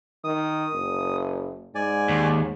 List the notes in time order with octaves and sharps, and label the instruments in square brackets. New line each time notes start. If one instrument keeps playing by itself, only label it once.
[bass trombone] D#3 [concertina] D#6
[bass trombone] F#1
[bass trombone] G#2 [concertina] D5 G#5
[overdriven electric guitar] D#2